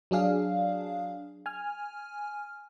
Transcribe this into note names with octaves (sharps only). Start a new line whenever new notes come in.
F#3 D4 G#4 F5
G#5 F6